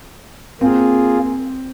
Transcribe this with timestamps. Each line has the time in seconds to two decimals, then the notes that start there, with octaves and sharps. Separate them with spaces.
0.61 A#3 C4 F4 G#4